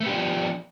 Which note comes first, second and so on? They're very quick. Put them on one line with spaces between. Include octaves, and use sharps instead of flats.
A3 B3 G4 D4 F3